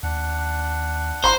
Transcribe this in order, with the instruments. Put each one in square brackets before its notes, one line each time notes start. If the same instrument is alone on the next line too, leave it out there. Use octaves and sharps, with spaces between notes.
[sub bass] D#2 [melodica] D4 F#5
[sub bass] G#1 [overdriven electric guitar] C5 [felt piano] A#5 C6